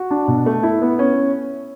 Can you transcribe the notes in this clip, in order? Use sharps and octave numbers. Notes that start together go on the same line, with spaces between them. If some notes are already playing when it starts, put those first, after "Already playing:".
Already playing: F#4
D4
B2
A3
E4
B3
C#4